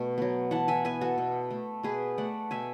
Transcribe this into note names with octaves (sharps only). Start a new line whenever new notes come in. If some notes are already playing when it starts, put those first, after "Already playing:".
Already playing: B2 A3
F#3 B3
E3 F#5 A5
E5 G#5
B3 E5 G#5
F#4 A4
B2
A3
B2 G#4 B4
A3 D5 F#5
B2 E5 G#5